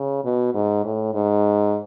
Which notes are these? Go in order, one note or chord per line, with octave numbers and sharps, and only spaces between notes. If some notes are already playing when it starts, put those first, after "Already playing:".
Already playing: C#3
B2
G#2
A2
G#2